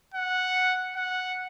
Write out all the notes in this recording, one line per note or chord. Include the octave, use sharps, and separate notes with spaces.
F#5
F#5